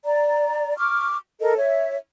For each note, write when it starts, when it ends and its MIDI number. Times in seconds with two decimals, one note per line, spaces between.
0.05 0.75 74
0.05 0.75 82
0.77 1.16 85
0.77 1.16 86
0.77 1.16 89
1.41 1.56 69
1.41 1.56 70
1.41 1.56 75
1.57 1.96 73
1.57 1.96 76